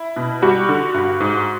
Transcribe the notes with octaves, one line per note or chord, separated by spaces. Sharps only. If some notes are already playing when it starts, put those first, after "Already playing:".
Already playing: E4
B2
G3 F#4
D3
G2
G#2